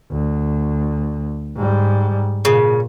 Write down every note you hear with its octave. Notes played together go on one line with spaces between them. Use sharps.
D2
G#2 G3
A#2 C#3